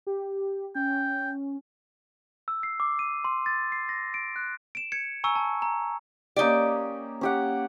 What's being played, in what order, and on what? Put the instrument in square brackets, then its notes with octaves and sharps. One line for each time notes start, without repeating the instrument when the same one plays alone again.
[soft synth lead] G4
[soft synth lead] C#4 [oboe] G5
[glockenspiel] E6
C7
D6
D#7
C6
A6
C7
A#6
D7
F#6
D7 E7
G#6 C#7
G#5 A#5 C#6 E6
A5
A#5
[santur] A#3 C#4 G4 [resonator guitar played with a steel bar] D#4 D5
[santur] C#4 G4 F#5